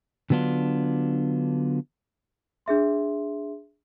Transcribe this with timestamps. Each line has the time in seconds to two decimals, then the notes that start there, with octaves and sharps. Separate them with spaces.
0.30 D3 F#3 B3 D4 F4
2.66 D4 G#4 E5 C6